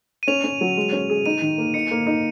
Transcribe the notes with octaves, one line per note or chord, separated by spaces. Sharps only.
D#7
C#4 F7
C#4
F#3
G#3
C#4
G#4
D#4 D#7
D#3
A#3
D#4 C#7
A#3
D#4